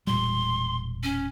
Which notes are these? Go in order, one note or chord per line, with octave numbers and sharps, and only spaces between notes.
E1 A#2 G3 C6
C#4